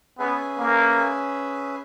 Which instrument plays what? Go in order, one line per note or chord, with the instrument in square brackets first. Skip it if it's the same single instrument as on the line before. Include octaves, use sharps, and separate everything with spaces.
[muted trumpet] B3 [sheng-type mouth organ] C#4 G#4 B4 E5 G#5
[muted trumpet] A#3